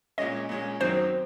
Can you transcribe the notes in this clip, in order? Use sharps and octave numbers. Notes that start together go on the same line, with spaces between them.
A#2 G#3 C#4 D#5
A#2 G#3 C#4
F#2 D#3 F#3 C4 D#4 C5